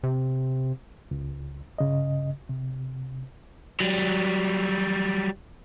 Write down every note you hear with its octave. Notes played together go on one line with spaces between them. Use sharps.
C3
C#2
G2 C#3 D#5
C3
F#3 G3